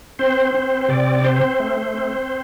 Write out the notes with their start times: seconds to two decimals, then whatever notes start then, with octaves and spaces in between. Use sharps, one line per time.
0.19 C4 C5
0.54 C4
0.81 C5
0.89 C3 D5
1.24 C4 C5
1.60 A3
1.94 C4